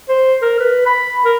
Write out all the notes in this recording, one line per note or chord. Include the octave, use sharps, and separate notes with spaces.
C5
A#4
B4
B5
A#4